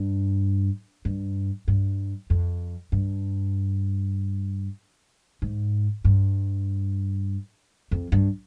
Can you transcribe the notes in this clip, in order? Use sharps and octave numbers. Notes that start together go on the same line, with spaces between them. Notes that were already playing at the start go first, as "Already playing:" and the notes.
Already playing: G2
G2
G2
F2
G2
G#2
G2
F2
G2